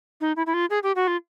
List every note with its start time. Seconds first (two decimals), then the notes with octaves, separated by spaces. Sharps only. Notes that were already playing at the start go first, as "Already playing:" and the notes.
0.21 D#4
0.36 E4
0.46 E4
0.54 F4
0.70 G#4
0.83 G4
0.96 F#4
1.08 F4